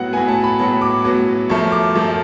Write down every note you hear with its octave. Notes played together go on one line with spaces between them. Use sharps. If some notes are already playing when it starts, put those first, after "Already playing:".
Already playing: A2 F#3 B3 F#5
A2 F#3 B3 G#5
A5
B5
A2 F#3 B3 A5
D6
A2 F#3 B3
F#2 F3 A3 C#6
D6
F#2 F3 A3